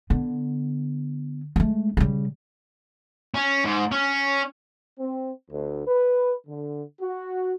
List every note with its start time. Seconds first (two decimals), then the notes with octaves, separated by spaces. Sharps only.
0.10 D3 B3
1.56 G#3 A3
1.97 C#3 G3
3.34 C#4
3.65 G#2
3.92 C#4
4.99 C4
5.50 D2
5.87 B4
6.47 D3
7.01 F#4